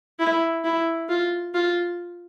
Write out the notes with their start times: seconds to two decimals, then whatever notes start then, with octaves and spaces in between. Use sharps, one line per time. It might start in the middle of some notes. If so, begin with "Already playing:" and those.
0.19 E4
0.64 E4
1.09 F4
1.54 F4